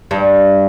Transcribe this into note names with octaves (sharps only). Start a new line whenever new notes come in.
G2